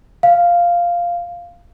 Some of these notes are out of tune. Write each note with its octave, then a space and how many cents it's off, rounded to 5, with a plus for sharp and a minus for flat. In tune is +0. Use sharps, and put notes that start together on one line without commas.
F5 -5